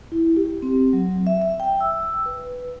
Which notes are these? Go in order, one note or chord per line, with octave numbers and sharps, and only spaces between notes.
E4
G4
C4
F#3
E5
E5
G5
E6
B4